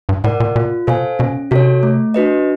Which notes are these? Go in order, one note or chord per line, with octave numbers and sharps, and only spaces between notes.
G2
A2 A#4 D5 F#5
A#2
A#2 F4
B2 A4 C5 F5 G#5
B2 C#4
C3 F#4 A4 C#5
A3
D4 F#4 B4 D#5